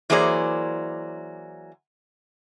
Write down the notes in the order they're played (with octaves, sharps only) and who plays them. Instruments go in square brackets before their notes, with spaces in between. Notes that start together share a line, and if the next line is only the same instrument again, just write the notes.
[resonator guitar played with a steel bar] E3 F#3 A#3 G#4 C5 D5